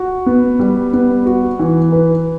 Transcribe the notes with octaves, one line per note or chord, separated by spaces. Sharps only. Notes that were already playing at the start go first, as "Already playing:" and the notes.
Already playing: F#4
B3
G3
B3
F#4
E3
B4